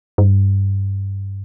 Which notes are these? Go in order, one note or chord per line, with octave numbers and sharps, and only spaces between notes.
G2